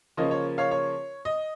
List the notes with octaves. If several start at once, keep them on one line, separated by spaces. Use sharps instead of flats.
C#3 F3 A#3 C#4 D#5
C#5
C#5 F5
C#5
D#5